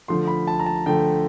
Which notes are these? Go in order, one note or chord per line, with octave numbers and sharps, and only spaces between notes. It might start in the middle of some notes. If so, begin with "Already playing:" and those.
D3 F3 A3 C6
B5
A5
A#5
A5
D3 F3 A3 G5